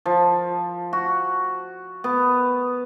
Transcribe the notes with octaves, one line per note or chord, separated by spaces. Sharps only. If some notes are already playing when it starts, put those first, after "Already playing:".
F3
F#4
B3